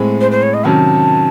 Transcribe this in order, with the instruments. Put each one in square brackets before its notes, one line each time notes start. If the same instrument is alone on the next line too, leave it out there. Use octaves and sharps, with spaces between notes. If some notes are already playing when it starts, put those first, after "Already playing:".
Already playing: [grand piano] A2 G#3 C4
[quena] C5
C5
C#5
D#5
[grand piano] C3 D#3 F#3 C#4 [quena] A5